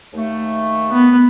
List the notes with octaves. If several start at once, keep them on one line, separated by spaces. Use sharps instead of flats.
D#2 A3
B3